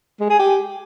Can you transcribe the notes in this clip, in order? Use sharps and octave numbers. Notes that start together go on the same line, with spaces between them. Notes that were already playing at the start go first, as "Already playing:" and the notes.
G#3
G#4
G4